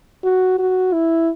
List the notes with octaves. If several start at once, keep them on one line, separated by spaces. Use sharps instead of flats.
F#4
F#4
E4